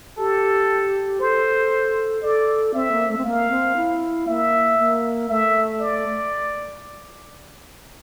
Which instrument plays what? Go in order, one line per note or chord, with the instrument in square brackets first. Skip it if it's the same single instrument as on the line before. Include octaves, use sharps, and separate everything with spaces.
[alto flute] G4 [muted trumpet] A4
[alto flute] A4 [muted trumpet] C5
[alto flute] A4 [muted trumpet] D5
[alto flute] C4 [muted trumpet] E5
[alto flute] A#3
A3
C4
[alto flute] A#3 [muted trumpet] F5
[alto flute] C4
E4
[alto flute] A#3 [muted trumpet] E5
[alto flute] A#3
[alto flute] A3 [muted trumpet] E5
[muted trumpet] D5